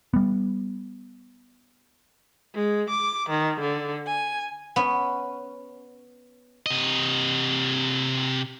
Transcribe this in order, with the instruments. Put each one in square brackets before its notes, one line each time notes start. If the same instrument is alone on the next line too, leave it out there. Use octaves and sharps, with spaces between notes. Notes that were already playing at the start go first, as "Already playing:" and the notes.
[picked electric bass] G3 B3
[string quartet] G#3
D6
D#3
D3
G#5
[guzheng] B3 C#4
[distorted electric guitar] C3 D#5